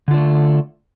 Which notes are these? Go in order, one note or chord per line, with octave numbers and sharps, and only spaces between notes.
D3 A3 D4 F4